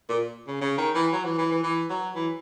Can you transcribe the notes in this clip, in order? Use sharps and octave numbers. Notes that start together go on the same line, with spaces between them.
A#2
C#3
C#3
D#3
E3
F#3
E3
E3
E3
E3
F#3
E3